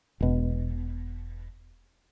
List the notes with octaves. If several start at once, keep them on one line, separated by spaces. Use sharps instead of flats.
E1 B2